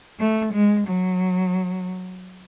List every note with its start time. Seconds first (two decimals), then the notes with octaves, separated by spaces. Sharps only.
0.19 A3
0.53 G#3
0.87 F#3